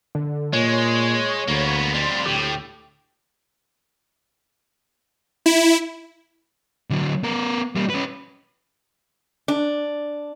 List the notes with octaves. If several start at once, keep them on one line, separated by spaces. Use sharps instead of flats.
D3
A#2 G#3 C#5
D2 A#3 B3
F2 G3 C6
D2 A2 G4
E4
D3 F#3
B3 A#4
G3 A#3
C#4 B4
D4